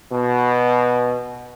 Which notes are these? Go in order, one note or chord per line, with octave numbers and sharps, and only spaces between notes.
B2